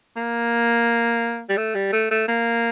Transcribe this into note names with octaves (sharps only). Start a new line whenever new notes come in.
A#3
G3
A3
G3
A3
A3
A#3